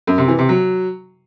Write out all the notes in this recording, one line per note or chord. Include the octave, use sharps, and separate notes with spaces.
F#2
C3
E3
C3
F#3